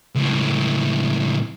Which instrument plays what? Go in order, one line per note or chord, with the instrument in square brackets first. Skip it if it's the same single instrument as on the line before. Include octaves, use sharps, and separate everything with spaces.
[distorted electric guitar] C#2 A2